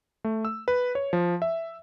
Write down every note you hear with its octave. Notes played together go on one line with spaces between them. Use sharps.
A3
E6
B4
C#5
F3
E5